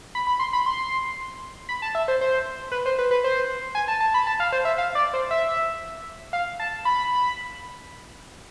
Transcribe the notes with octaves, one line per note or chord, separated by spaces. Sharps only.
B5
B5
C6
B5
C6
B5
A5
E5
C5
C5
B4
C5
B4
B4
C5
G#5
A5
A5
B5
A5
F5
C5
E5
F5
D5
C5
E5
F5
A5
B5